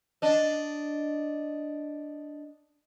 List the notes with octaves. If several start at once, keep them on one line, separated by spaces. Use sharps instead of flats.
D4 D#5